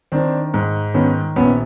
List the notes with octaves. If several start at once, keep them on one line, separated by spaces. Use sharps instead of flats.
D#3 C4 D4
G#2
D#3 B3 C#4
A#1 B3 C#4